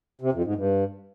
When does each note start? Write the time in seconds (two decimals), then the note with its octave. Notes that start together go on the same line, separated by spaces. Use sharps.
0.21 C3
0.33 F2
0.44 G#2
0.55 G2